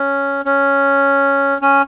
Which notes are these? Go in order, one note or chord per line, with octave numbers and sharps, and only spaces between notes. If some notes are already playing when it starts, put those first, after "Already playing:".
Already playing: C#4
C#4
C#4